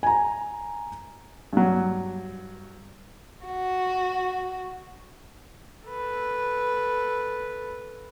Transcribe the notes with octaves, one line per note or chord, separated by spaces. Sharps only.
G#5 A#5
G2 F#3
F#4
A4 B4